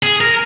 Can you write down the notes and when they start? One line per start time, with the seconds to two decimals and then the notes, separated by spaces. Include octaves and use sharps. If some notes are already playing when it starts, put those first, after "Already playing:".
0.03 G#4
0.21 A#4